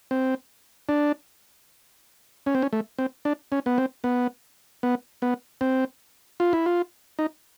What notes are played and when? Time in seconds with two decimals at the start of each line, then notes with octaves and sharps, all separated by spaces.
0.11 C4
0.89 D4
2.46 C#4
2.55 C4
2.62 C#4
2.73 A3
2.98 C4
3.25 D4
3.52 C#4
3.66 B3
3.78 C4
4.04 B3
4.83 B3
5.22 B3
5.61 C4
6.40 F4
6.53 E4
6.66 F4
7.19 D#4